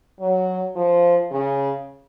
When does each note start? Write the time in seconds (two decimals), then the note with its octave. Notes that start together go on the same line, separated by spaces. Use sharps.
0.20 F#3
0.75 F3
1.31 C#3